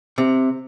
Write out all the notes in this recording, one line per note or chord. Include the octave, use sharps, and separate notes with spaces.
C3